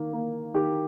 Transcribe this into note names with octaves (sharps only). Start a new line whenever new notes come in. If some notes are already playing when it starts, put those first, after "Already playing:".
Already playing: D#3 A#3
A#3
D#3 G4